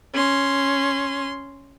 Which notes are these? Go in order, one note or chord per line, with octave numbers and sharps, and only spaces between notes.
C#4 C6